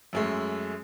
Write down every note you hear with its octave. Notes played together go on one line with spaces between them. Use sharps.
F#2 G#3 A3